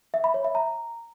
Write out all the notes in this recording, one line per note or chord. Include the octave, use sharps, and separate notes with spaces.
E5
B5
C#5
E5
A#5